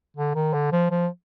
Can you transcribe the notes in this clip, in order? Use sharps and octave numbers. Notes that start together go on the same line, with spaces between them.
D3
D#3
D3
F3
F3